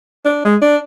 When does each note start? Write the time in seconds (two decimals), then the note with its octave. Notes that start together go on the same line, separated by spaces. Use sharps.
0.25 D4
0.45 G#3
0.62 D4